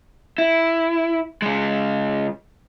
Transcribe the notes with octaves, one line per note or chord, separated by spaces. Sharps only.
E4
C#3 G#3